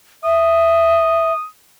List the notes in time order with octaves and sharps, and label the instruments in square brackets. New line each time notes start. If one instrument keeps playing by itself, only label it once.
[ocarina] E5 [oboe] D#6